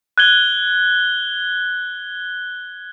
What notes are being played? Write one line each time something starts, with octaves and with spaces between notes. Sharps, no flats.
F#6 G#6 G7